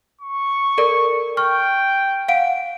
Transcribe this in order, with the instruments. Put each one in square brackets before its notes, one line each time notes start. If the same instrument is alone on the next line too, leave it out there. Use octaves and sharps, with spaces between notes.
[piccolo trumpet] C#6
[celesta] A4 A#4 D5
[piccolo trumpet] G5 [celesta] C#6 F6
[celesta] F5 F#5 D7